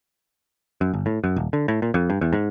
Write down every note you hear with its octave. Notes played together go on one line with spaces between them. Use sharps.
F#2
G1
A2
F#2
D#1
D3
A2
A#2
F2
G2
E2
G#2